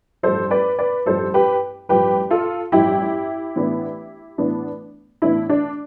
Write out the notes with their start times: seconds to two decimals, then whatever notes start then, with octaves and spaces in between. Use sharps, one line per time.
0.23 A1 G2 F3 A4 C5
0.51 B4 D5
0.79 B4 D5
1.06 A1 G2 F3 A4 C5
1.34 G4 B4
1.89 A1 G2 F3 G4 B4
2.31 F4 A4
2.72 A1 G2 F3 E4 G4
3.56 A2 E3 B3 D4
4.38 A2 E3 B3 D4
5.22 A2 E3 B3 D4 E4
5.49 D4